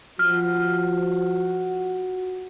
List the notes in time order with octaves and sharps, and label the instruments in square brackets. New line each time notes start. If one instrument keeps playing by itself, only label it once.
[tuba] F3 [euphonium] F#4 [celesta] F6